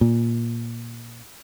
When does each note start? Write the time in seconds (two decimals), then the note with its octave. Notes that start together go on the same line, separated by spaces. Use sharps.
0.01 A#2